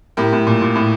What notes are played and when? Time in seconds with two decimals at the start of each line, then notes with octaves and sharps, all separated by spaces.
0.17 A2 G4 A#4
0.33 A2
0.47 A#2
0.62 A#2
0.76 A2